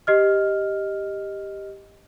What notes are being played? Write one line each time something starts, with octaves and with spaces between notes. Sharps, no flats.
G4 D#5 F6